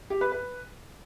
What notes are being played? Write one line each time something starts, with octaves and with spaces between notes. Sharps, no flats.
G4
B4
B4